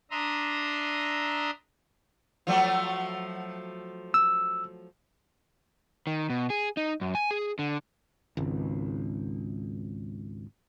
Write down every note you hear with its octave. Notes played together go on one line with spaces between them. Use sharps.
D4 E5 A#5 C6 D#6
F3 F#3 A3
E6
D#3
B2
G#4
D#4
F#2
G#5
G#4
D3
G#1 C#2